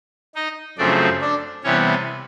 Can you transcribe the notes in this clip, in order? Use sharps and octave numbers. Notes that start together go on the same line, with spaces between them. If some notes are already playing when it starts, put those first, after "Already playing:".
D#4 D#5
F#2 C#3 F3 A3 C4 D4 D5
D4 D5
C3 E3 G3 B3 C#4 C#5